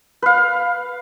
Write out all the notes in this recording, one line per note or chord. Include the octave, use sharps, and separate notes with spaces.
B4 F5